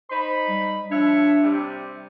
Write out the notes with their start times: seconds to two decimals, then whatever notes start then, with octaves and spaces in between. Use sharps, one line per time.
0.11 D#4 C5 B5
0.49 G3
0.91 F3 D4 C#5 E5
1.43 C3 G3